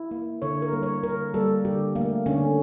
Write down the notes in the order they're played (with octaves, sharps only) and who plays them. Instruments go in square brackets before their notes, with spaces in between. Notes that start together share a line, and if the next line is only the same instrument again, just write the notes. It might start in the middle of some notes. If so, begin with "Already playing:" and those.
Already playing: [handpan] E4
A#3
D3 C#5
A#4
G3 A#3
C#5
D3 A#4
G3 A#3 A4
D3 G4
A3 A#3
D3 C#4